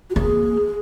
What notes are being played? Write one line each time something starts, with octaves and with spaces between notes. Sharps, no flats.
F#4
A#3 G#4